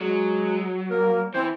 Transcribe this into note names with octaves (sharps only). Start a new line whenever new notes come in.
F#3 G#3 G#4
A#3 A#4
E3 C4 C5